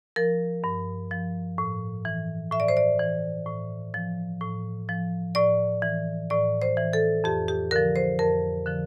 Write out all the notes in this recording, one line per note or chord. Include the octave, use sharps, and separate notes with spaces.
F3 A#4
G2
F3
A2
E3
A2 E5
D5
C5
D5
E3
A2
F3
A2
F3
A2 D5
E3
A2 D5
C5
E3
A4
F2 G4
G4
D3 F3 A#4
C5
F2 A#4
D3 F3